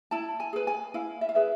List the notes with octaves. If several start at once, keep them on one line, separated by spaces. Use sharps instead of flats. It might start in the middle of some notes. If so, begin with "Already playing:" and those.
E4 A5
G#5
G#4 B4
G#5
E4 F5
E5
F5
G#4 B4 E5